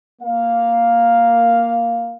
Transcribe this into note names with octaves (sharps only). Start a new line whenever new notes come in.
A#3 F5